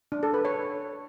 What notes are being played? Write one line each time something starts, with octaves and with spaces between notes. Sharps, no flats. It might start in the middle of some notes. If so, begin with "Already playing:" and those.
D4
A4
B4
C#5